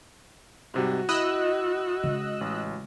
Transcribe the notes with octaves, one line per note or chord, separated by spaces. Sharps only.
G#2 C3 G3 F#4
E4 D#5 B5 E6 F#6
C#3 G#3
A1